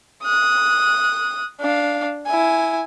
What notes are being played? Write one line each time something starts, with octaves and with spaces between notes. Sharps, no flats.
D#6 F#6
D4 F5
E4 G#5